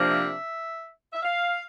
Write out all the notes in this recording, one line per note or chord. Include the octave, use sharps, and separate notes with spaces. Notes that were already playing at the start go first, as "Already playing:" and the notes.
Already playing: C3 F3 A#3 D4
E5
E5
F5